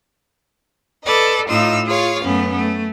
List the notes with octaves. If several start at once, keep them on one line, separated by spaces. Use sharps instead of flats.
A4 B4 D5 D#5
A2 D#4 F4 F5 E6
F4 G#4 C#5 F5
F#2 A3 B3 C#4
A3